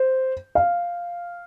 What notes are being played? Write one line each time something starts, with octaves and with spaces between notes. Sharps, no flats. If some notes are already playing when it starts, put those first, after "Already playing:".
Already playing: C5
F5